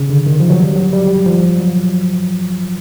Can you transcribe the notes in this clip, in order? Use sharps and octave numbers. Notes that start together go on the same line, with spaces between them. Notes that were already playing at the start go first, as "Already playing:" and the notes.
Already playing: C#3
D3
D#3
F3
F#3
G3
F#3
G3
F3
F#3